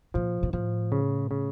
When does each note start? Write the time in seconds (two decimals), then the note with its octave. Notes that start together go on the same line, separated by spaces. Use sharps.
0.14 A#2 F3
0.43 A#2
0.53 A2 F3
0.92 C#3
1.31 C#3